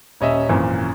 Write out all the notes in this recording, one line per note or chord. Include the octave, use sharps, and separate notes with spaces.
D#1 C#4 D#5 E5
G#1 F#2 A#2 E3